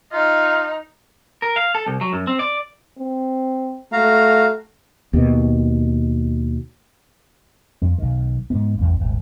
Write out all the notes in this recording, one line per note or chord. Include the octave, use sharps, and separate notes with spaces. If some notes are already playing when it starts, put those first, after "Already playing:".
D#4 F4
A#4
F5
A4
C2
F#3
F#2
C4
D5
C4
A3 F#4 F5 A#5
D#2 B2
F2
B1 D#3
G#2 B3
A1 E2
D#1 G#1